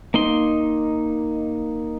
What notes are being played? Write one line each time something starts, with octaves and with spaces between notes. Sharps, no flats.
A#3 D#4 C6